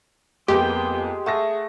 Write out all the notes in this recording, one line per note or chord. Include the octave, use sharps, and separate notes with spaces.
F2 G#3 A#3 B3 G4 G5
A3 G#4 F#5 A5 A#6